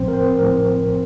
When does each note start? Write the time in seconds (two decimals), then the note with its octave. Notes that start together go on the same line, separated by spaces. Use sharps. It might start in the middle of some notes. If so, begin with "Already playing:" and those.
Already playing: A#1 A2 F3 C4 C5
0.08 A#4
0.13 C4 C5
0.39 A#1 A2 F3 A#4